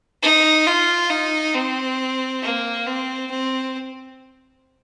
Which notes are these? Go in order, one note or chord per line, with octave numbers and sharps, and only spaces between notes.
D#4
F4
D#4
C4
A#3
C4
C4